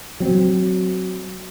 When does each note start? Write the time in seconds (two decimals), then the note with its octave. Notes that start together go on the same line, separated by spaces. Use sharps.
0.20 F#3 C4